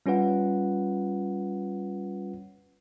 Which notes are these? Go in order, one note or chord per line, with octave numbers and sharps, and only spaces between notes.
G3 C#4 F4 B4 F#5